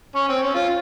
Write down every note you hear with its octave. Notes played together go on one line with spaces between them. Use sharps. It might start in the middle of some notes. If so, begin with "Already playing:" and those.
C#4
C4
C#4
F4